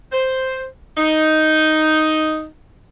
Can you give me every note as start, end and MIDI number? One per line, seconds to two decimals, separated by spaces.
0.12 0.65 72
0.96 2.46 63